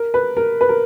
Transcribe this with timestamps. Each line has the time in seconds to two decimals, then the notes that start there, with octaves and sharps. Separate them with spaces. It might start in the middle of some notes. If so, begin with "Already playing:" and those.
Already playing: A#4
0.14 B4
0.37 A#4
0.61 B4
0.69 A#4